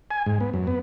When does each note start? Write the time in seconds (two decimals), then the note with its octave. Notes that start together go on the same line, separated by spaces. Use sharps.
0.11 G#5
0.26 G#2
0.40 B3
0.54 F#2
0.67 B3